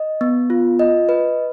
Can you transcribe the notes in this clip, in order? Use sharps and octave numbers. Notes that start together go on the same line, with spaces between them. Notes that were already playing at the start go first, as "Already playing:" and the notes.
Already playing: D#5
B3
F4
D#5
B4